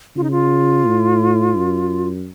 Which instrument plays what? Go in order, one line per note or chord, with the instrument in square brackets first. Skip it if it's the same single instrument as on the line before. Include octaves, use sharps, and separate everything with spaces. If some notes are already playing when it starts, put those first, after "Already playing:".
[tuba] C#3 [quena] F4
[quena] D#4
F4
[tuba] A2
F#2